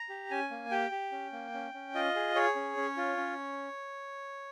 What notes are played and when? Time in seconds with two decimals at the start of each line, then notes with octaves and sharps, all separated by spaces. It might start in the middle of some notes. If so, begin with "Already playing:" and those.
Already playing: A#5
0.09 G4
0.31 C#4 G#5
0.51 A#3
0.71 G4 G5
0.91 G4
1.12 C#4
1.32 A#3
1.54 C#4
1.74 C#4
1.95 F4 D#5
2.15 G#4
2.35 G#4 C#5
2.56 C#4
2.77 C#4
2.97 F4
3.17 C#4